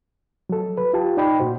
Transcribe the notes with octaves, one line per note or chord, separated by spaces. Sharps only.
F#3 A4
B4
F4 G4 A5
D#4 D5 G5 B5
A#2 F#4 C5